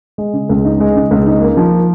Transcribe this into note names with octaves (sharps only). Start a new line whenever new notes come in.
G#3
C#3
C#2
D#4
G#3
C#3
C#2
D#4
A#3
F3